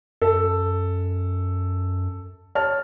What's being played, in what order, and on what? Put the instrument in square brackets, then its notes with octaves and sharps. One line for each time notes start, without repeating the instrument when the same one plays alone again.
[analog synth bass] F#2 [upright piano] A4
[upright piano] C#5 A5 F6